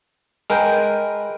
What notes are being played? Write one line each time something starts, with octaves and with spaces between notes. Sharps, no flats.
G#3 A#4 B4 G5